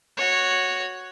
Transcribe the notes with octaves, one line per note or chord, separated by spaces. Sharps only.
F#4 C#5